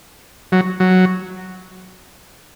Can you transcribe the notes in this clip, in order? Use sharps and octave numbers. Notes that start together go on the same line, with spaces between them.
F#3
F#3